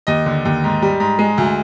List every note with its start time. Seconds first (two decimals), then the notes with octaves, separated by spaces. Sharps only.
0.07 D#2 D#5
0.26 D3
0.45 D#2
0.64 G#2
0.82 G3
1.00 G#2
1.19 G#3
1.38 D2